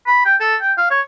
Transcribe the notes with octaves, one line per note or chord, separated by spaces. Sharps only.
B5
G5
A4
G5
F5
C#5